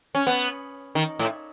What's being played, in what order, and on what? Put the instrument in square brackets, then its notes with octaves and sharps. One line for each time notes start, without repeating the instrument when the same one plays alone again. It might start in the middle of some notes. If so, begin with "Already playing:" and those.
[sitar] C#4
B3
D#3
A2